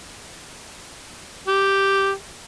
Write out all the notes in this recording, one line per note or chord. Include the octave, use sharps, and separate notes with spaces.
G4